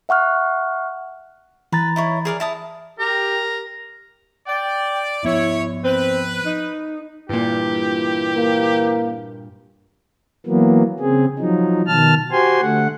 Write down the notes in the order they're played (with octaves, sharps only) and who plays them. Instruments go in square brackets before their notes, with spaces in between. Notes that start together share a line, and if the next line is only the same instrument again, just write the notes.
[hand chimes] E5 F#5 C#6 F6 F#6
[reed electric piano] E3 A#5 A6 [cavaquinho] B4
[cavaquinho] D#4 E4 C#5
G#4 A#4 D5
E4 A5 D#6
[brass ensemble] G4 [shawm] A#4
[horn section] D5 [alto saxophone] G5
[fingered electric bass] F3 B3 [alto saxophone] E4 [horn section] C#5
[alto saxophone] C4 [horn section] B4
[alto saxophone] D#4
[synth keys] G2 A#2 [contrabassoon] E3 [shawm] G4
[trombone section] A#3 A#4
[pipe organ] E3 F#3 A#3 B3
C#3 C4 G#4
F3 F#3 D#4
B2 D#3 A5 F6
F#4 G4 C5 G#5 C6
D3 A3 F#5